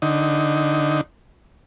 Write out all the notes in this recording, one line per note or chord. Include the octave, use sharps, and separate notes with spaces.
D3 D#4